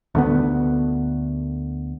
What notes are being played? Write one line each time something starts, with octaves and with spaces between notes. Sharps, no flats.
D2 D3 B3